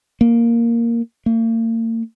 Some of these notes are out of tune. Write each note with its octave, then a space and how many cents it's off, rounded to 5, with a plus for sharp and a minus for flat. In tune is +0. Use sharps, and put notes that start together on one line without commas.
A#3 +0
A#3 -45